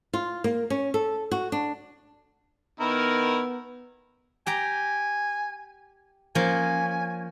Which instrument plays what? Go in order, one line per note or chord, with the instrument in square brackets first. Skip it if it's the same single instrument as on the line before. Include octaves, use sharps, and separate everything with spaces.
[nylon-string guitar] F4
A#3
C#4
A4
F#4
D4
[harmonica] D#3 E4 A#4 [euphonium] B3
[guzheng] G4 G5 A#5 [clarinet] G#5
[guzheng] F3 A#3 C#4 [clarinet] G#5